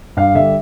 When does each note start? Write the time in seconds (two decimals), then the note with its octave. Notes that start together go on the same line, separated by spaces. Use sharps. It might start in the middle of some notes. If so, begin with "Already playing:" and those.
0.17 G2 F5
0.34 D3 G3 E5